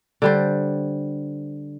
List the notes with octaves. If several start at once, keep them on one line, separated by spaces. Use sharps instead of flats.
D3 G3 C5